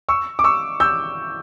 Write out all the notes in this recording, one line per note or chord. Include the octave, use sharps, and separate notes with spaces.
C#6 E6
D6
C#6 E6
E6 G6